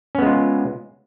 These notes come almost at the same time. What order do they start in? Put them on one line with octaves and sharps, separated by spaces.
C#4 B3 G#3 F4